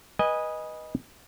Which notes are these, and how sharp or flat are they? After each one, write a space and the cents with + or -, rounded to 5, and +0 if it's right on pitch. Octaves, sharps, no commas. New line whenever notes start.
B4 -25 D#5 +0 G#5 -15